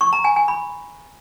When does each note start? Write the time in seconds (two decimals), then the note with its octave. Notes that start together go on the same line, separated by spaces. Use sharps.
0.01 C#6
0.13 A#5
0.24 G#5
0.36 G#5
0.48 B5